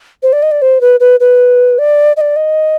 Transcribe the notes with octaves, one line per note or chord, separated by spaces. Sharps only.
C5
D5
D#5
D5
C5
B4
B4
B4
D5
D#5
D5
D#5